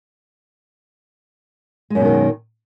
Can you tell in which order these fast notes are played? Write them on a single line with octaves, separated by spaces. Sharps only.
G#3 F#2 B2 D#3